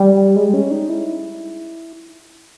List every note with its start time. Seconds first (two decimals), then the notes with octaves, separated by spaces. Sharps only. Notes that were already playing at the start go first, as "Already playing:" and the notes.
Already playing: G3
0.36 G#3
0.54 C#4
0.71 D#4
0.89 E4